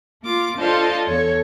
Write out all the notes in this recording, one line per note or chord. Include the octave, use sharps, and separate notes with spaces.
A#3 F4 D6
D4 F4 A4 C5 D#5 F5
E2 A4 C#5